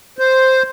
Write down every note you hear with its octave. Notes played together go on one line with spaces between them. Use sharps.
C5